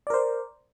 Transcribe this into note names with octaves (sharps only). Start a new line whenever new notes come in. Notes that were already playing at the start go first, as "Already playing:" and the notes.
A#4 C5 D5